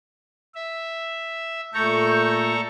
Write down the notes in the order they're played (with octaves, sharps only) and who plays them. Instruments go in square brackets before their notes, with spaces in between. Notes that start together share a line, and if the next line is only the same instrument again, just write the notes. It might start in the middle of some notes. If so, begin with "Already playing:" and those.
[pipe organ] E5
[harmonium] A#2 A3 [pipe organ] A4 A#5 C#6 [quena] G6